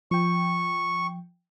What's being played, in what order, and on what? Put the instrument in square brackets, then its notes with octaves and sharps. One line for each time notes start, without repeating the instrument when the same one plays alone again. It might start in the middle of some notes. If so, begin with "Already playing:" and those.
[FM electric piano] F3 G5 [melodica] C#6